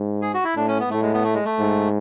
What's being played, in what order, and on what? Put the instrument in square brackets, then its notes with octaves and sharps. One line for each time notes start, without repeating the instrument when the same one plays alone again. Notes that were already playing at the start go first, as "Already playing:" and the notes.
Already playing: [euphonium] G#2
[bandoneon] G#4
F#4
E4
[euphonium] A2 [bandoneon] D4
[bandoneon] C#4
B3
[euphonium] A2 [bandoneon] A3
[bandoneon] G#3
B3
A3
G#3
A3
[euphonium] G#2